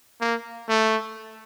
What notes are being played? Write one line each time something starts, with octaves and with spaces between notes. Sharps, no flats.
A#3
A3